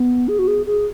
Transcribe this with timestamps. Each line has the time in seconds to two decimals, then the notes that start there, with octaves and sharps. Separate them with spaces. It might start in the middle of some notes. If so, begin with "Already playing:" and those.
Already playing: B3
0.28 G#4
0.39 F#4
0.48 G#4
0.66 G#4